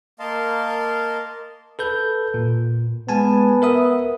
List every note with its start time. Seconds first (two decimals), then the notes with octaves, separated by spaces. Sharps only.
0.20 A#3 A#4 D#5 F5 A5 C6
1.79 A4 B4 G6
2.34 A#2
3.09 G#3 B3 G#5 A5
3.62 A#4 E5 D#6